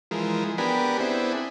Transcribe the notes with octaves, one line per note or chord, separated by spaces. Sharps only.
E3 F3 G#3 A#4
B3 D4 G4 A#4 G#5 B5
B3 C4 D4 E4 G#4